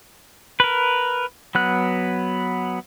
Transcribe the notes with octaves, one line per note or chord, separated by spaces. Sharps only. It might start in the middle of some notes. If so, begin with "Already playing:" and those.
A#4 B4
F#3 B3 F#6